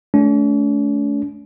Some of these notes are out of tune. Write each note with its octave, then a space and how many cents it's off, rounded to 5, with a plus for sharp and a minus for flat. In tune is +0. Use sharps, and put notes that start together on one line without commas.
A3 -30 C#4 +45